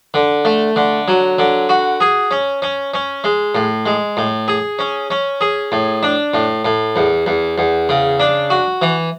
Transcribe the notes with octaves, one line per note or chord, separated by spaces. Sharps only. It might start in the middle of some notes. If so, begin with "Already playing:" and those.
D3
A3
D3
F#3
D3
F#4
G#4
C#4
C#4
C#4
G#3
A2
G#3
A2
G#4
C#4
C#4
G#4
A2
D4
A2
A2
E2
E2
E2
C#3
D4
F#4
E3